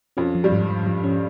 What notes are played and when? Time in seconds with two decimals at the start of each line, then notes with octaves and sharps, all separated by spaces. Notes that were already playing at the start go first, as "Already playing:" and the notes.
0.17 F2 F3 C#4
0.35 F3
0.44 G2 G3
0.52 G#2
0.69 F3
0.87 F3
1.04 C#4